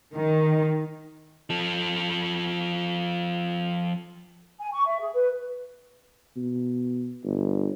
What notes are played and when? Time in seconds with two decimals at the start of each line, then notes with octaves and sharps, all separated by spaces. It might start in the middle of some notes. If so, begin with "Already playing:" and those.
0.15 D#3
1.50 F3 A4
4.59 G#5
4.73 C#6
4.86 E5
4.99 G#4
5.13 B4
6.37 B2
7.25 G1